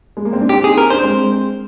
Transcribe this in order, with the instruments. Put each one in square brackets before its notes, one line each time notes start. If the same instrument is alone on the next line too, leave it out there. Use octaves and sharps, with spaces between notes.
[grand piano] G#3
A#3
C4
D4
[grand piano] C4 D#4 [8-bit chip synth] G4
[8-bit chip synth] G#4
A#4
[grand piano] D4 [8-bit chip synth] C5
[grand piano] G#3 C4